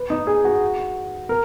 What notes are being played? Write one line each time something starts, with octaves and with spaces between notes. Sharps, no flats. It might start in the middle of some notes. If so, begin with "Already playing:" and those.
Already playing: B4
D#4
G#4
F#4
A#4